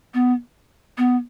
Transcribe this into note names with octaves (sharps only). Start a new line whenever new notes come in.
B3
B3